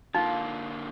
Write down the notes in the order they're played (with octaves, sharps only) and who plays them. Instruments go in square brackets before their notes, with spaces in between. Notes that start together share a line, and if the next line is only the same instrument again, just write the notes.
[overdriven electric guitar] D3 A#3 [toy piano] D#4 [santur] F4